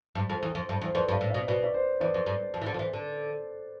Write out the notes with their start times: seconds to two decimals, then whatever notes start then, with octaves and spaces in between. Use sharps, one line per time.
0.15 G2
0.30 F2
0.43 E2
0.55 F2
0.69 G2
0.81 E2 C5
0.94 F2 B4 D5
1.09 G2
1.12 D5 F5
1.21 A2
1.30 B2 D5 F5
1.47 B2 B4 D5
1.64 D5
1.74 C5
2.00 E2 B4 D5
2.14 F2
2.26 G2
2.54 F2
2.62 E3
2.66 D3
2.74 F3
2.79 E3
2.93 D3